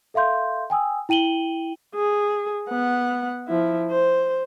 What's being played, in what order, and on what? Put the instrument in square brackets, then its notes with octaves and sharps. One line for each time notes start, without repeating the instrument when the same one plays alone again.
[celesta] A4 E5 F5 C6 G6
G5 G#5 D#6 E6
E4 G5 D#7 F#7 G7
[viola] G#4
B3 F#5
F3 E4
C5